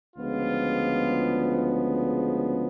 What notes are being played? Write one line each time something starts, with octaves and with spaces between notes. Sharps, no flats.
D2 C#3 F3 G#3 B3 F4